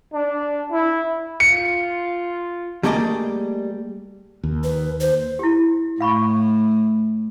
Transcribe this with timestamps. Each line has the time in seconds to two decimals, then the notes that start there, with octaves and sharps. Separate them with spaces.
0.14 D4
0.71 E4
1.40 F4 C#7
2.83 G3 A3 A#3 G#4 D5 D#5
4.44 D#2
4.64 B4
5.01 C5
5.39 E4 G4
6.00 A2 F5 B5 C#6